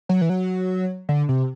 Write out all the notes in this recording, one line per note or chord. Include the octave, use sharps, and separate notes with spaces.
F#3
E3
F#3
D3
C3